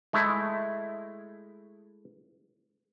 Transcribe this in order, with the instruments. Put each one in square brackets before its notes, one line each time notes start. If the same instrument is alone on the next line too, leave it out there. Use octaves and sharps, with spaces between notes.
[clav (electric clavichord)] G#3 A3 E4